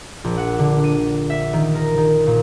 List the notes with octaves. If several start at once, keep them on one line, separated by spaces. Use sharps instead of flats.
A#1
F#5
D3
D#7
E5
D#3
A#4
D#3
A#2